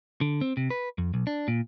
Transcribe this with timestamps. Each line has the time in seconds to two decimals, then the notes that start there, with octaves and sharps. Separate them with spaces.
0.21 D3
0.41 C4
0.57 C3
0.70 B4
0.98 F2
1.14 B1
1.27 D4
1.48 A#2